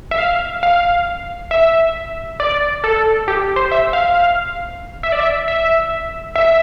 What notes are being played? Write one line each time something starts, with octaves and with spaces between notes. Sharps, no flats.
E5
F5
F5
E5
D5
A4
G4
C5
E5
F5
E5
D5
E5
E5
E5